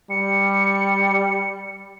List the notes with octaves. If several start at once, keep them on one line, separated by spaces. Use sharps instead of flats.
G3 C#7